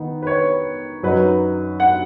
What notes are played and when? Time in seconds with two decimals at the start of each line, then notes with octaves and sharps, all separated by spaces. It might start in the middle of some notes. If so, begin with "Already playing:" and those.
Already playing: D#3 B3 D#4
0.23 B4
0.27 C#5
1.03 F#2 F#3 D#4 B4
1.80 F#5